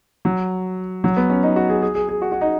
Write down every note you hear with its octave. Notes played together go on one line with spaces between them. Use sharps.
F#3
F#3
B3
C#4
D#4
F#4
G#4
G#4
G#4
G#4
F#4
F#4
D#4